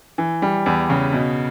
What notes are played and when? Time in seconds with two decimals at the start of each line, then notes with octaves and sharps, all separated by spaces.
0.18 E3
0.42 G3
0.66 E2
0.90 C#3
1.13 B2